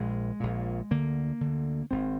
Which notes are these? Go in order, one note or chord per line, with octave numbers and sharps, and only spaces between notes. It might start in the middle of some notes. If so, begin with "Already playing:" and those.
Already playing: A#1 A#2 G#3
A#1 A#2
D2 D3 A#3
D3
D2
G#1 G#2 C4